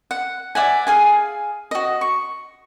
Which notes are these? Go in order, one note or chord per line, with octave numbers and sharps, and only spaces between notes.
F#5
D5 E5 F#5 G#5
G#4 F5 G#5
F#4 D#5
C#6